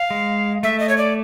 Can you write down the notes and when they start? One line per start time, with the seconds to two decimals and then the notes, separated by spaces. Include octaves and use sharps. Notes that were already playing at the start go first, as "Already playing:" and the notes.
Already playing: F5
0.10 G#3
0.63 A3 E5
0.80 D#5
0.89 C#5
0.98 D5